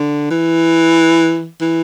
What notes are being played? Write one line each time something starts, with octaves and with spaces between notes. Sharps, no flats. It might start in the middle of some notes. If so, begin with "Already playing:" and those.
Already playing: D3
E3
E3